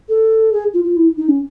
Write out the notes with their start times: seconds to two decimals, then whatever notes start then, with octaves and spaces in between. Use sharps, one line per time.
0.09 A4
0.53 G#4
0.74 F4
0.84 F4
0.96 E4
1.17 D#4
1.28 C#4